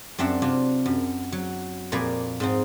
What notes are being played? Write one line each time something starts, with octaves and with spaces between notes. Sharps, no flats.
F#2 C4 D4 E5 F#5
C3 D4 F4
F#2
F#3
F2 A#2 A#3 D5 G#5 B5
G#2 C4 D#4